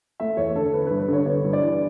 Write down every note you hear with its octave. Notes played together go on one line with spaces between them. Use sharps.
A3 E5
E2 C#5
D3 A4
B3 B4
B4
G2
B4
D3 C#5
B3 C#5
G2
D5
E3